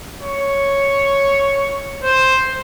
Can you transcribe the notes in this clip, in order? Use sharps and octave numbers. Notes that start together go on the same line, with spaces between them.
C#5
C5